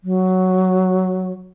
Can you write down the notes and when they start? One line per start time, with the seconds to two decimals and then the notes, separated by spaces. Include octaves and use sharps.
0.04 F#3